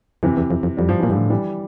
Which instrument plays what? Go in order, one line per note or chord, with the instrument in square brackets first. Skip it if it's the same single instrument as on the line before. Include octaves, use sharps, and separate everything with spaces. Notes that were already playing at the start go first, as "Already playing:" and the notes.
[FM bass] F2 [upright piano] C3 E3
[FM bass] E2
F2
F2
[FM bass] F2 [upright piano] G3
[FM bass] G2 [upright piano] F3
[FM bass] A#2 [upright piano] E3
[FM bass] G2 [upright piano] D3 F3
[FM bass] A2
[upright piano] E3 G3